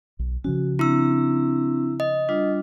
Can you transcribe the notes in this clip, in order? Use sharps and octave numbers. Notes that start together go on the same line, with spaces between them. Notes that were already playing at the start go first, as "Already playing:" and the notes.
B1
C#3 F3 C#4 F#4
C4 D4 E4 E6
D#5
G3 D4 F4